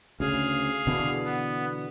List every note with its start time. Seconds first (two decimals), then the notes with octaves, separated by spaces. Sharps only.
0.20 D2 C#3 G#4 F5
0.87 B2 D3 E3
1.24 B3